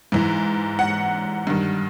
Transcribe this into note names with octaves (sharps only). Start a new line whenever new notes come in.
G#2 E3
F#5
G2 D#3